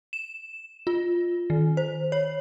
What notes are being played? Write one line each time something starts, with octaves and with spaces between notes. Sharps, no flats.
E7
F4
D#3
C5
C#5